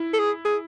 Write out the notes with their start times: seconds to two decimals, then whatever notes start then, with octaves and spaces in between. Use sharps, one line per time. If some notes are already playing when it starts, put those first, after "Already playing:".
Already playing: E4
0.14 A4
0.19 G#4
0.45 G#4